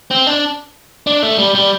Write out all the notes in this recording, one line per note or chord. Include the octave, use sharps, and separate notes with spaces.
C4
D4
D4
A3
G3
G3